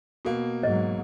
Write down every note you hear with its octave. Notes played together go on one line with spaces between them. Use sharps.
B2 A#3
G#2 F#3 D#5